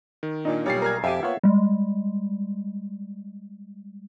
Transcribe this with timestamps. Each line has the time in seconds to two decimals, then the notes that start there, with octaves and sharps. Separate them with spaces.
0.23 D#3
0.45 A#2 D4 D#4
0.66 B1 A#2 G3 C#5 A6 C7
0.82 A#4 A#5 F6 G#6
1.04 F2 G4 E5 G#5
1.23 A#3 B3 F4 C#5 F#5 G5
1.44 G3 G#3